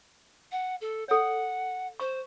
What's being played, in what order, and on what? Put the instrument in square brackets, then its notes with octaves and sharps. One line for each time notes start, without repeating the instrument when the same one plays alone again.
[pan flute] F#5
A4
[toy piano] A4 C#5 [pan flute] F#5
[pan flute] C5 [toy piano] C#6